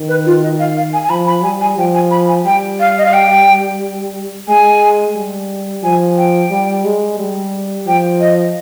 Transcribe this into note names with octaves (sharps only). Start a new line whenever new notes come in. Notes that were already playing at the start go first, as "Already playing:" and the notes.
Already playing: D#3
B4
F4
D#5
F5
F5
G#5
G#5
F3 B5
B5
G3 G#5
G#5
F3 G5
G#5
B5
G#5
G3 G5
F5
D#5
F5
G5
G#3 G#5
G3
F3 G#5
G5
G3
G#3
G3
F3 G5
D#5